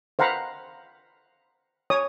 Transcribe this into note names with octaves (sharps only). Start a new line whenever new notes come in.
C5 F5 F#5 A#5 B5
C#5 D#6